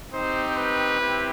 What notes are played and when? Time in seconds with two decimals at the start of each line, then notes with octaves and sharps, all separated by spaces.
0.12 C4 D#4 G4 C5
0.56 B4
0.99 C4 E4 G4